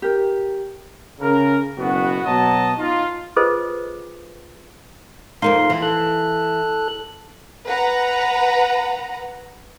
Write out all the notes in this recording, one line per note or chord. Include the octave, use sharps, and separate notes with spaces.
G4 A#4
C#3 A#4
F#1 B2 B3 F#4
B2 F#3 D#5 A5
D#4 F4
F4 G#4 A4 B4 C5 D#5
F2 A#3 D#4 F5 C6
E3
A4 F#6
B4 F#5 A#5